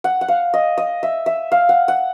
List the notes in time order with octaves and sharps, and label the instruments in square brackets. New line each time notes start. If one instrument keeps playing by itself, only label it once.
[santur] F#5
F#5
F5
D#5
D#5
E5
E5
F5
F#5
F#5